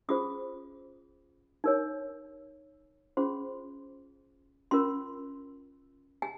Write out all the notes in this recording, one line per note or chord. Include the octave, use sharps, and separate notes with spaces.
C#4 F4 G#4 C5 D#6
D#4 A#4 C#5
C#4 F4 G#4 C5 C6
C#4 F4 A#4 C6
G#5